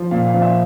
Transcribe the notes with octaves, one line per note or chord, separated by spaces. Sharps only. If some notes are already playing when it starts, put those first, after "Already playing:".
Already playing: F3
A#2 F5
F5
F3
E5